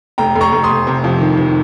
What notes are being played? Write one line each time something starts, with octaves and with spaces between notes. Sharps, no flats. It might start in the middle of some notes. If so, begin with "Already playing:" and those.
F1 G5 A#5
F1
A#5 C#6
F1
C6 D#6
F1
C3
F2
D#3
D#3